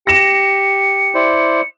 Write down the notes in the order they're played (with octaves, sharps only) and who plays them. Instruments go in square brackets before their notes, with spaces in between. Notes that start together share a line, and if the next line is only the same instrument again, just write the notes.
[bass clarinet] G4 [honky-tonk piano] A#6 E7 [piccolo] C#7
[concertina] E4 C5 D5